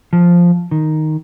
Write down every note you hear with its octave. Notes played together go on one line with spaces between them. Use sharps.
F3
D#3